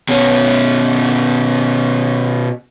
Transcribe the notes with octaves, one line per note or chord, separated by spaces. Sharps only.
B2 C#4